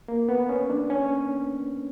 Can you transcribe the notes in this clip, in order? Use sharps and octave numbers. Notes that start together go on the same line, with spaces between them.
A#3
B3
C#4
D4
C#4